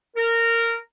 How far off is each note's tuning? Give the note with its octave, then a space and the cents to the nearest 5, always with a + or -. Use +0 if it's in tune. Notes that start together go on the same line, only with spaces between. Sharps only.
A#4 -15